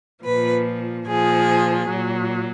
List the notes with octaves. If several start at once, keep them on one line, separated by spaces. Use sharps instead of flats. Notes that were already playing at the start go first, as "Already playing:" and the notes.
A#2 F3 B4
A#2 F3 G#4
A#2 F#3